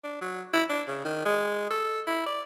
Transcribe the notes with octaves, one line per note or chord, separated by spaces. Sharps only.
D4
F#3
E4
D4
C#3
D#3
G#3
A4
E4
D5